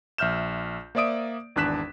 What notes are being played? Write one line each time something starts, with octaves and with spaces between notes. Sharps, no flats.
A#1 E5 F6 G6 E7
A#3 C5 D5 E5 D#6 D7
G#1 E2 D4 F#6 B6 E7